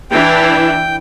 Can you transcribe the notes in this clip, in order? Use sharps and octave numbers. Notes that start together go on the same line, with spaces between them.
E3 D4 E4 G5